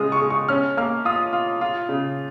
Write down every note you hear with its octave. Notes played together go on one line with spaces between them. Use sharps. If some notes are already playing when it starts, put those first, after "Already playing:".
Already playing: C#3 G#3 F4 D#6
C#6
G#3
C#6
C#4 F6
A#3 F6
F4 D#6
F4
F4
C#3